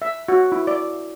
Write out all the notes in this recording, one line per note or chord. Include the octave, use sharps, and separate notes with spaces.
E5
F#4
E4
D5